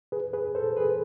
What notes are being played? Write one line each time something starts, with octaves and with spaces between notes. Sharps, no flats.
G#4 B4
G#4 B4
A4 C5
G#4 B4